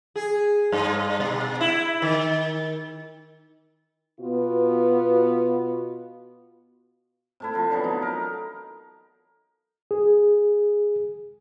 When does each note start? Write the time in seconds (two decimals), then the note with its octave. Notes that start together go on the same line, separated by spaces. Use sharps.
0.16 G#4
0.72 G2
1.20 B2
1.61 E4
2.02 D#3
4.20 B2 B3 F4 F#4
7.40 C3 A3 E4
7.53 F3 A3
7.70 D3 E3 F#3 B3
7.84 D#4
8.02 A#4
9.91 G#4